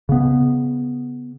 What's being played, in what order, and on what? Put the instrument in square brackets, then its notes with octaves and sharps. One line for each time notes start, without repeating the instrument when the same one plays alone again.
[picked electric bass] C#3 B3